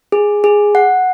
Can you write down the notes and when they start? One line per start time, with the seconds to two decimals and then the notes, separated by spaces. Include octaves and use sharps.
0.12 G#4
0.44 G#4
0.75 F#5